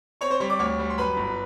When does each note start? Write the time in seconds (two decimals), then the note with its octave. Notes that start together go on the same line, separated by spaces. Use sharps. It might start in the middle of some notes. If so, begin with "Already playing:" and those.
0.21 C4 C#5 C#6
0.31 C5 C6
0.40 G3 C#5 C#6
0.50 D5 D6
0.59 D2 C#5 C#6
0.79 G3
0.90 C6
0.98 F#2 B4 B5
1.17 G1